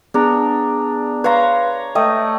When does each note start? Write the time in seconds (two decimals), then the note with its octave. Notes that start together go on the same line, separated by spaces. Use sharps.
0.14 B3 D4 G#4 A#5
1.24 B4 C#5 F5 A#5 C6
1.95 A3 D#5 G5 D#6